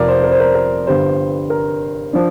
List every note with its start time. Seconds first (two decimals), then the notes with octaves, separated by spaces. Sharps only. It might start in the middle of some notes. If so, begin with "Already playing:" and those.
Already playing: F1 F2 F3 C4 A#4 D5
0.08 C5
0.24 A#4
0.31 C5
0.40 A#4
0.55 A#4
0.87 G1 G2 G3 C5
1.50 A#4
2.13 F3 D4